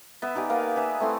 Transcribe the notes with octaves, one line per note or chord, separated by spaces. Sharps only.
B3 E5
D#4 G4 G#4 D5
A#3 B3 A#4 F5
G#4 B4 E5
A3 C4 E4 C6